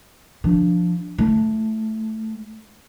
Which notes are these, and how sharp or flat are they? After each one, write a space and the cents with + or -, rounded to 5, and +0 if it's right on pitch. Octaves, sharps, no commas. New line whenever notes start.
F3 +0 D4 +0
A3 +0 E4 +25